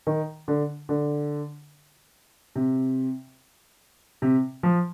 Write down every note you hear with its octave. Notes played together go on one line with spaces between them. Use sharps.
D#3
D3
D3
C3
C3
F3